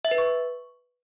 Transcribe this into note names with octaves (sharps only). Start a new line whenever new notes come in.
E5
B4
C#6